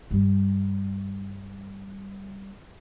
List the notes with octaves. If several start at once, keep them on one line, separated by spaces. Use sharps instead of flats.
G2 G3